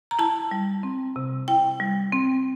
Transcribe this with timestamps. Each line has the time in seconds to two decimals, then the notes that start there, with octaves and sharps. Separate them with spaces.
0.11 A#5
0.19 E4 A5
0.51 G3
0.83 C4
1.16 C3
1.48 E4 G5
1.80 G3
2.12 C4